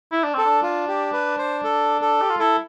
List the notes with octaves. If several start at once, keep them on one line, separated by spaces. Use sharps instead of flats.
E4
D4
C4 A4
D4
F4
G4
B4
C5
A4
A4
G4
F4
E4 A4